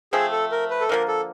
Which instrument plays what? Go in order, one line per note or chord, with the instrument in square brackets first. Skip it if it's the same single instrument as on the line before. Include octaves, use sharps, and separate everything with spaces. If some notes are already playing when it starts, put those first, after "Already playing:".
[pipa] F3 A3 C4 [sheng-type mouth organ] G#4
[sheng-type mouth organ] A4
A#4
B4
A4
[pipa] D3 F3 A#3 [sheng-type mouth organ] A#4
[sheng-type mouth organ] A4